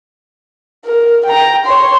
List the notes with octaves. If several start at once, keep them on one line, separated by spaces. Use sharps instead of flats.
A#4
G5 A#5
C#5 C6